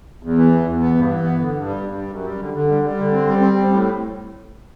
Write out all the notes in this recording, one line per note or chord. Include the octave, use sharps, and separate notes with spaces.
E2
E3
E2
E2
B3
G2
E3
B3
D3
G2
G3
G2
G3
F#2
G3
D3
D3
G3
G3
D3
C4
G3
C4
G3
A2